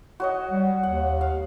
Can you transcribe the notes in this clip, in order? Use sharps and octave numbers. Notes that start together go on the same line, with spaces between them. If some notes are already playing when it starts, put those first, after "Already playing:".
F#4 C#5 D#5
G3
D#2 F#5
F5